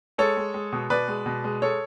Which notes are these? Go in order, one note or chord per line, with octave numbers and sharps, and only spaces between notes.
G#3 A4 C#5
G#3
G#3
B2
B2 B4 D5
G#3
B2
G#3
G#3 A4 C#5